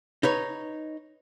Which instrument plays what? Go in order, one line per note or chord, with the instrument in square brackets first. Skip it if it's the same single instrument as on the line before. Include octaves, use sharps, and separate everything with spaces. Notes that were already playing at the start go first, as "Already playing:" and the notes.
[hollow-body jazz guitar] D#4 B4 C#5